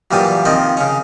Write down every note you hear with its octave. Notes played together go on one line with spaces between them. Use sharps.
F#2 A#2 E3 G3 G4 D#6
D#3 F3 C4 D#5
C#3 C#4